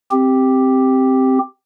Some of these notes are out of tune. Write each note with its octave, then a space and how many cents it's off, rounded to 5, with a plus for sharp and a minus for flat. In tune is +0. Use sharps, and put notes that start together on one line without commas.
C4 +0 G4 +0